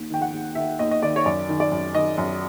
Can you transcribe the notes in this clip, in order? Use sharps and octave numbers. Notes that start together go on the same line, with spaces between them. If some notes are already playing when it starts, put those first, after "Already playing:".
Already playing: D#2
D#3 G5
F#5
D#2
D#3 E5
D#2 D#5
D#5
D#3 D5
C#5
F#2 D5
D#3
D5
F#2
D#3 D#5
F#2